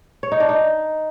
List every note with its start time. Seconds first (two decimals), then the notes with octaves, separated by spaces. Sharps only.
0.23 C#5
0.32 D#4
0.40 D4
0.49 D#4